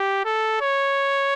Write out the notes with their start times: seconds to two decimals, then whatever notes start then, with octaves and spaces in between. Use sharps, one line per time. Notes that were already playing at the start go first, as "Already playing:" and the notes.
Already playing: G4
0.25 A4
0.61 C#5